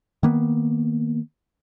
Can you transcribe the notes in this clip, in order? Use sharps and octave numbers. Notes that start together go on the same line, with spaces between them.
D#3 A#3 B3